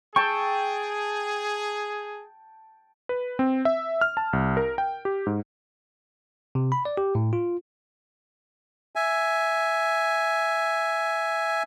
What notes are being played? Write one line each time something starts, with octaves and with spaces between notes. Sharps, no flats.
G#4 G5 A5 C#6 E6
B4
C4
E5
F6
A5
C2
A#4
G5
G4
G#2
C3
B5
D5
G4
A2
F4
E5 G#5